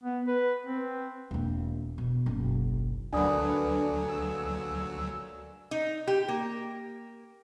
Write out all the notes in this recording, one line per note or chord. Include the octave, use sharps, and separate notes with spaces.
B3
B4
C4
E1 A#3
B2
F#1 B1
D2 D3 F#3 A#3 D4 B4 G#5 D#6
G#4 E6
D#4
G4
A#3